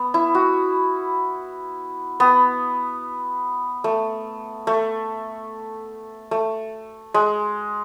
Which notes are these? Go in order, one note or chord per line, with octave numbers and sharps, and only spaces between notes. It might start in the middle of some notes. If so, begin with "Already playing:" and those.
Already playing: B3
E4
F#4
B3
A3
A3
A3
G#3